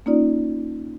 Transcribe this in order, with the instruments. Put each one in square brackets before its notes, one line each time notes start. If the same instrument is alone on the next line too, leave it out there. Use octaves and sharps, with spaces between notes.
[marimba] A#3 C#4 D#4 F4 D5